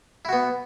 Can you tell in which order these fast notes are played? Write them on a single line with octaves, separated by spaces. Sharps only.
E4 F#4 B3